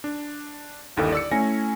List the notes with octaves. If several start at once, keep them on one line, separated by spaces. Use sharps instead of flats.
D4
G1 D#2 D3 E4 A4 D#5
D5 E6 C#7
A3 C#4 E4 G#5 A#6